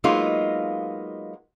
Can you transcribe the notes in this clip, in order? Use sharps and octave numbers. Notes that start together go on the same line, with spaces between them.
F#3 G#3 A#3 B3 D#4 F4